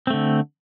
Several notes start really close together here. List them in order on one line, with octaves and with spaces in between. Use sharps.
C4 A3 D3